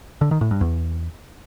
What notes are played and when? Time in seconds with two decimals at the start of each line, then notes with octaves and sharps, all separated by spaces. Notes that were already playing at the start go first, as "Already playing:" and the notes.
0.21 D3
0.31 D#3
0.41 A2
0.51 G2
0.61 E2